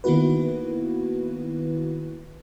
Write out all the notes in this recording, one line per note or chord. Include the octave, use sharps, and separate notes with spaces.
D#3 A#3 B3 E4 F#4 B4